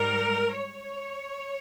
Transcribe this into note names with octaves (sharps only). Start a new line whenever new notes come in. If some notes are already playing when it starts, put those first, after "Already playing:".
Already playing: G#2 G3 A#4
C#5